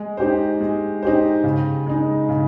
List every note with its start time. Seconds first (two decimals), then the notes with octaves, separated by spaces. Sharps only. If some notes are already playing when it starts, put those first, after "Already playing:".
Already playing: G#3
0.17 D#4 G4 C5
0.60 G#3
1.03 D#4 G4 C5
1.44 C#3
1.86 G#3 D#4
2.29 C#3